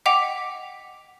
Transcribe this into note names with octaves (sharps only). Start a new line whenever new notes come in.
D#5 F#5 G5 D6 B6 F7